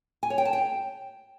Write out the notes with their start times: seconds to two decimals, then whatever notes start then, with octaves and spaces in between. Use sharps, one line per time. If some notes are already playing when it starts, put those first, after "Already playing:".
0.23 G#5
0.30 C#5
0.38 G5
0.45 A5
0.53 G5